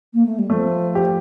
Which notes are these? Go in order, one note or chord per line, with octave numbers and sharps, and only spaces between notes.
A#3
A3
G3
F3 A3
G4